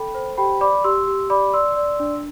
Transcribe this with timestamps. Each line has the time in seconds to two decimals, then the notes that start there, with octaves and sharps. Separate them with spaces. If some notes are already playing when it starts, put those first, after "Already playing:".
Already playing: A4 G5 B5
0.15 C5
0.37 G4 G5 B5
0.61 D5 B5 D6
0.84 G4 C6 E6
1.07 G4
1.30 D5 B5 D6
1.53 D5 C6 E6
1.76 D5
2.00 D4